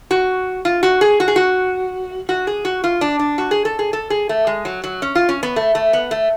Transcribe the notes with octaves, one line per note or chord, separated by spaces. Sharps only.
F#4
F4
F#4
G#4
F#4
G#4
F#4
F#4
G#4
F#4
F4
D4
D4
F#4
G#4
A4
G#4
A4
G#4
A3
G#3
F#3
F#3
C#4
F4
C#4
B3
A3
A3
B3
A3